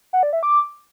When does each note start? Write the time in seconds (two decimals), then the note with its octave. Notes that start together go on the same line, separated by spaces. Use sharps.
0.13 F#5
0.23 D5
0.33 E5
0.43 D6